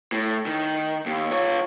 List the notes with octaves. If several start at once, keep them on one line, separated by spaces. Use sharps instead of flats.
A2
D#3
D#2
F4 C#5